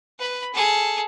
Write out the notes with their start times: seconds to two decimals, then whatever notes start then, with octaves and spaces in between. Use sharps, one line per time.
0.19 B4 B5
0.53 G#4 A4